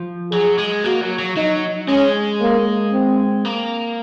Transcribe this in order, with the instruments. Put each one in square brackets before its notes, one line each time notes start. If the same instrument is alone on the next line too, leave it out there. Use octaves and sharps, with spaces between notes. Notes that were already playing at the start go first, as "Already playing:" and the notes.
Already playing: [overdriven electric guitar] F3
[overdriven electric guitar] F#3 [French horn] G#4
[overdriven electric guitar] G#3
[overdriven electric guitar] A#3 [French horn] F#4
[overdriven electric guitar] F#3
F#3
[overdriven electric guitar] F#3 [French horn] D#4
[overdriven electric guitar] G#3 [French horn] C#4
[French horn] A#3
C4
[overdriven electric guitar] A#3